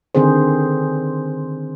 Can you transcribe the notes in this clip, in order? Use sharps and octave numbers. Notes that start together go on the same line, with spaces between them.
D3 D#3 C4 G#4 C5